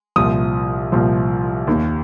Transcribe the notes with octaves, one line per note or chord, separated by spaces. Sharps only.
C2 A#2 F3 D#6
C2 A#2 F3
D#2 D#3 A#3